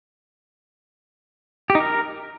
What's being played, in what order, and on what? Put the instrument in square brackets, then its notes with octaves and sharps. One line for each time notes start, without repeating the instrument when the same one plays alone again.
[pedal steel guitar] G4
D#4
A#4